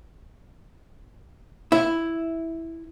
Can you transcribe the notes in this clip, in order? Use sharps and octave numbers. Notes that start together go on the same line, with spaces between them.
E4